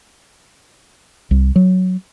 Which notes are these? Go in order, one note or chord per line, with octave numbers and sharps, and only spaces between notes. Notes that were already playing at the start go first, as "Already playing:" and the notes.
C2
F#3